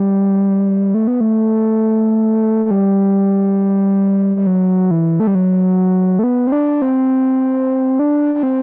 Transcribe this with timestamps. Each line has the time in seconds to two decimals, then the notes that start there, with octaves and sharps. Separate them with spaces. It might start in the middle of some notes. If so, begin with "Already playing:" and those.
Already playing: G3
0.94 A3
1.07 B3
1.21 A3
2.65 A3
2.71 G3
4.36 G3
4.47 F#3
4.91 E3
5.20 A3
5.27 G3
5.35 F#3
6.19 A3
6.23 B3
6.47 C4
6.52 D4
6.82 C4
7.99 D4
8.34 D4
8.43 C4